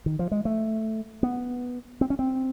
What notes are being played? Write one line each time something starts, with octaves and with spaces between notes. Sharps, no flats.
D#3
F3
G#3
A3
B3
C4
C#4
C4